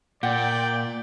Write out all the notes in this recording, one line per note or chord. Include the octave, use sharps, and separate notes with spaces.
A#2 D5 F#5 G5